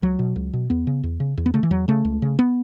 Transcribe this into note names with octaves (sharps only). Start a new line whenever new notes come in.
C#2 F#3
B2
C#2
B2
E2 B3
C#3
E2
C#3
E2
B3
C#3 A3
E3
E2 F#3
C#3 A3
C#2
C#3
B3